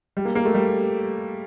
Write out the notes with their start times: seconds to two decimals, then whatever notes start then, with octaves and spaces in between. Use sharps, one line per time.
0.17 G3
0.25 A#3
0.35 A#3
0.45 A3
0.55 G3